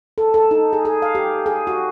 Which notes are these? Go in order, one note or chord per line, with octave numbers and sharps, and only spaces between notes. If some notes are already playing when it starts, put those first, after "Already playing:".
A4
A4
D#4
G#4
G#4
F5
G4
G#4
F#4